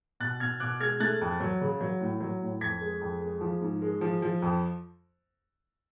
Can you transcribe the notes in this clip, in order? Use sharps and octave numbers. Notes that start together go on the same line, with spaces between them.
B2 F#6 A6
B2 F6 G#6
B2 D6 F#6
G#3 F6 G#6
A3 F#6 A6
F2
F#3
C#3
F#3
A2
F#3
A2
F2 G#6 B6
G#3
F2
G#3
F3
G#2
G#3
F3
F3
F2